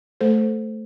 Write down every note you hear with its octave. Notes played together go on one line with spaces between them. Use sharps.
A3 A4 C5